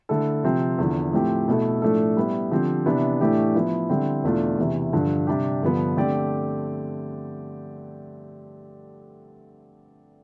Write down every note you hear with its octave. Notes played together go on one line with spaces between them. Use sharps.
D3 A3 E4 A4
C3 F3 C4
E2 D3 F3
A2 F3 A3 C4 G4
B2 A3 E4 A4
A2 F3 A3 D4 A4
G3 B3 E4
D3 F3 C4 G4
C3 E3 B3 D4
A2 E3 A3 D4 G4
F3 B3 E4
D3 G3 C4 E4
E2 B2 A3 D4 F4
E2 C3 E3
G2 D3 F3
C3 G3 D4 G4
G2 D3 F3 B3
D3 A3 C4 G4 D5